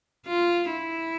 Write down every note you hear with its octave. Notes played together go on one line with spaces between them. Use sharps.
F4
E4